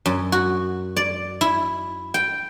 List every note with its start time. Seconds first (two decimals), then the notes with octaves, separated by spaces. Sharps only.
0.06 F#2
0.32 F#4
0.96 D5
1.41 E4
2.14 G5